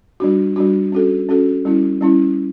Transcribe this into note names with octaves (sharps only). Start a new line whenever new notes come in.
G3 D4 F#4
G3 D4 F#4
C#4 F#4 A4
C#4 F#4 A4
G3 C#4 E4
G3 C#4 E4